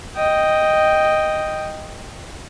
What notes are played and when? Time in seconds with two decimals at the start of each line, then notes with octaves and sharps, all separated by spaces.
0.17 D#5 G5